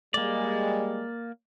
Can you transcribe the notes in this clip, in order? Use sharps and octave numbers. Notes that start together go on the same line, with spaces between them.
G3 G#3 A#3 D5